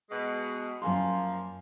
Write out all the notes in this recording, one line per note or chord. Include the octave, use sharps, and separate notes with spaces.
B2 G#3
F#2 F3 A#3 G#5 C6